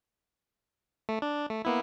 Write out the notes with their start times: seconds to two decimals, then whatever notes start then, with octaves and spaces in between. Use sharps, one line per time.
1.09 A3
1.22 D4
1.50 A3
1.65 A#3 B3 E4